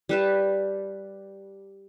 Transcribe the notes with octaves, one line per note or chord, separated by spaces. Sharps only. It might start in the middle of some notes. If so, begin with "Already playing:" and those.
G3 B4 A5